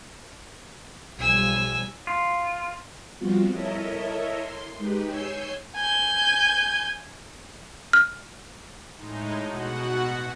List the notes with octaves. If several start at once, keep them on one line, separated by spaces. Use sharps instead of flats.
B1 F3 G3 G#5 E6
F4
F3 G3 B3 C4 F4 F#4
E4 A4 A#4 C#5 D#5 E5
C6
G#3 D#4 G4 B4
C#5 G#5 E6 G6 C7
G#5 G6
F6
A2 G#3 D#4
B2 F#4 F#5